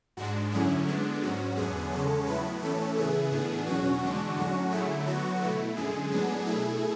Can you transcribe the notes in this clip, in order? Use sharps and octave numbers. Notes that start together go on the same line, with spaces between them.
G#2 G#3 D4 F#4
F#2 D3 F#3 C#4 E4 G#4
D3 G#3 B3 D4
G#2 F#3 C#4 F#4
E2 D3 F#3 B3 G#4
E2 C#3 G#3 C#4 A4
A2 F#3 B3 E4 B4
A2 E3 A3 C#4 A4
C#3 E3 B3 E4 G#4
A2 E3 B3 D4 G#4
E2 B2 F#3 C#4 F#4
E2 D3 G#3 D4 F#4
A2 F#3 C#4 F#4
D3 F#3 A3 E4 G#4
D3 F#3 B3 F#4
B2 A3 E4 F#4
F#2 D3 G#3 G#4
A2 F#3 B3 D4 G#4
B2 A3 E4 G#4